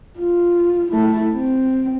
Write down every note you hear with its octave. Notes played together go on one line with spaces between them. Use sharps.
F4
A3 E4
C4